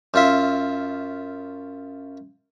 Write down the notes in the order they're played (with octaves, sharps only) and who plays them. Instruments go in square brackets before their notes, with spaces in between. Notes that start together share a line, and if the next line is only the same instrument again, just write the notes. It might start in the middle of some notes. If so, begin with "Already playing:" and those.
[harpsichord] F#2 F4 E5